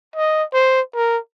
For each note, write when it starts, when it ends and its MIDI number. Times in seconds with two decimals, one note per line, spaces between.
0.16 0.44 75
0.54 0.81 72
0.95 1.18 70